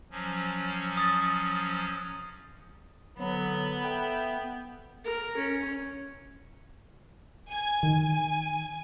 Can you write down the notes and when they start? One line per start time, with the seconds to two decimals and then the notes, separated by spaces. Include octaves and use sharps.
0.11 F3 F#3 C#4
0.97 D#6 A6
3.19 D3 F#3 B3
3.83 A4 E5 G5
5.05 A#4
5.37 C#4
7.49 G#5 G#6
7.83 D#3 G#5